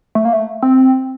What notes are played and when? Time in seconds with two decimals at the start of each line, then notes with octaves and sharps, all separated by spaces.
0.15 A3
0.25 A#3
0.33 A3
0.63 C4